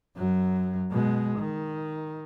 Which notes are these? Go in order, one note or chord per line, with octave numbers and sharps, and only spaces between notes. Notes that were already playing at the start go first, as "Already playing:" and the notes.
F#2 F#3
B2 G#3
D#3